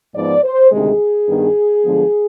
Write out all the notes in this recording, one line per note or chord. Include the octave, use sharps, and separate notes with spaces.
G#2 F3 B3 D5
C5
D2 C3 D#3 G#3 G#4
G2 D#3 B3
G2 D3 F3 G#3 B3